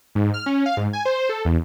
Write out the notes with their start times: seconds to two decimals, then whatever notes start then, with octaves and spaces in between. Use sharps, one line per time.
0.15 G#2
0.34 F6
0.46 C#4
0.66 F5
0.77 G#2
0.93 G#5
1.05 C5
1.29 A4
1.45 E2